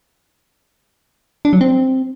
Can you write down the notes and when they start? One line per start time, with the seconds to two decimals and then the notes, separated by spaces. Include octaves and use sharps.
1.45 D4
1.53 F#3
1.61 C4